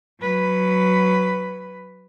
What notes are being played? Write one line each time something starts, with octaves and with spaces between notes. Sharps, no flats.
F#3 B4